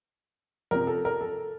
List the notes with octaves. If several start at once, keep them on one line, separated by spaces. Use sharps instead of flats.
C3 F3 A#4
A4
A#4
A4